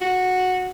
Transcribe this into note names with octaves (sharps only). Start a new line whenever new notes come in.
F#4